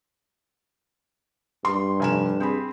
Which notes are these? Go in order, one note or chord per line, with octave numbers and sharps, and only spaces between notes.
G2 C6
F1 G#5 E7
C4 G#4 B5